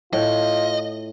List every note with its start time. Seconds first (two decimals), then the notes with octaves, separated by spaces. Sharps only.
0.13 A2 F4 D#5